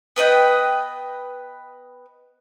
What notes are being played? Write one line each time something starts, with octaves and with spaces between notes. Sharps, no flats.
B3 B4 D#5 G5